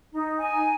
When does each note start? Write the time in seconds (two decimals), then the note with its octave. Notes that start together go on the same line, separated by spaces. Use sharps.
0.12 D#4
0.40 G#5